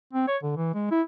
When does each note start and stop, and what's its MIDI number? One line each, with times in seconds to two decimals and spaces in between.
0.13 0.27 60
0.28 0.37 73
0.43 0.54 50
0.56 0.71 52
0.75 0.89 56
0.91 1.02 64